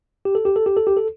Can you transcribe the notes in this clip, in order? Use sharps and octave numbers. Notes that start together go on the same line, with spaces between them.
G4
A4
G4
A4
G4
A4
G4
A4